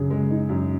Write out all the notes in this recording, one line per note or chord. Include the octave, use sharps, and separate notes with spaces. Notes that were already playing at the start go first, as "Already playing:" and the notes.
Already playing: F#2 C#3 G#4
G#3
D#4
F#2